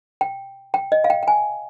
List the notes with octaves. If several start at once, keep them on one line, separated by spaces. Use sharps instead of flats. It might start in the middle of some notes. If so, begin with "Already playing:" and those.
G5
G5
D#5
F5
G5
G5
G#5